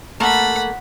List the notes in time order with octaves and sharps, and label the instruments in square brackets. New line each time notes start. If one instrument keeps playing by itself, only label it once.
[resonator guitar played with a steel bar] A3 A#3 [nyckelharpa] F#5 B5